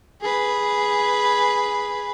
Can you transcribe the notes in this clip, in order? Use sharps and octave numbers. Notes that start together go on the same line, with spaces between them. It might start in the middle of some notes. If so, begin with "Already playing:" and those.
G#4 B4